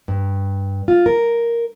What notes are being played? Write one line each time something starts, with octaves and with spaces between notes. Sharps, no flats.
G2
F4
A#4